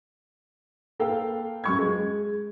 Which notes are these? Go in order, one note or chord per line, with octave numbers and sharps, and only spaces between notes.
A#3 A4 B4 F5 G5
F#2 C#6 G#6
G#3